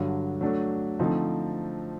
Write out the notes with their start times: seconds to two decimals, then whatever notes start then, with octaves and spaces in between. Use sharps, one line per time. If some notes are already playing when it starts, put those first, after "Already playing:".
Already playing: G2 D3 F#3
0.41 F#3 A3 D4
0.99 D3 F3 A3 C4 D#4